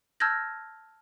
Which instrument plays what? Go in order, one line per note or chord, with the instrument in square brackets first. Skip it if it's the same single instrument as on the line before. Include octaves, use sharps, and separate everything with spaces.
[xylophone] A5 E6 F6 G6 G#6 A#6